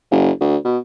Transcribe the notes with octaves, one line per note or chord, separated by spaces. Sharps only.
F#1
D2
B2